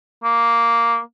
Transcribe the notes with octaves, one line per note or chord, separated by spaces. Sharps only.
A#3